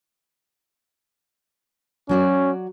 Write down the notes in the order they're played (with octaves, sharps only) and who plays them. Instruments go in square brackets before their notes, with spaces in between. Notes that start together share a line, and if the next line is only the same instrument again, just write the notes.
[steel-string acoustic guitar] F#3 F#4 D5 [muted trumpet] C#4